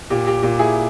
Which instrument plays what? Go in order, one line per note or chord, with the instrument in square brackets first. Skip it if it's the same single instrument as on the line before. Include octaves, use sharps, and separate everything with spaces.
[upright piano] A#2 G4
G4
A#2 G4
E4 G#4